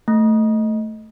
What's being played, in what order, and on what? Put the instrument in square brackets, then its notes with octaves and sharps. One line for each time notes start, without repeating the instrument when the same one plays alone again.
[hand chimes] A3